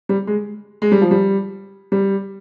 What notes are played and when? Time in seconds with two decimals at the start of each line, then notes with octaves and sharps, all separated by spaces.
0.09 G3
0.27 G#3
0.82 G#3
0.92 G3
1.01 F3
1.11 G3
1.92 G3